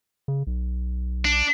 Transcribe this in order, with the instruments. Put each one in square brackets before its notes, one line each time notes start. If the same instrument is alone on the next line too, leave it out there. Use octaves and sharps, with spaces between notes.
[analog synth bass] C#3
B1
[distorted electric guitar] D4